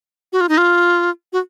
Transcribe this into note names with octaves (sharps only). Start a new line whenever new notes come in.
F#4
F4
D#4
F4
F#4